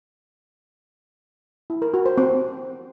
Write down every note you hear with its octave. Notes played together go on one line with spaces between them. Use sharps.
E4
A#4
F#4
C5
C4